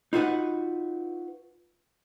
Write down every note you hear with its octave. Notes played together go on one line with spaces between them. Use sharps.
D#4 F4 F#4 B4 F#5